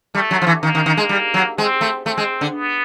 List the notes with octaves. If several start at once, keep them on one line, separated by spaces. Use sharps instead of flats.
G3 A3
F#3
F3
E3
D#3 A#3
D#3
D#3
G#3
G3
F#3
G#3 C4
A3
A3 C4
G#3
D3
B3